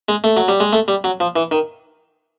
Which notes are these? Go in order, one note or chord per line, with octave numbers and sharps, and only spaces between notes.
G#3
A3
F#3
G3
G#3
A3
G3
F#3
F3
E3
D#3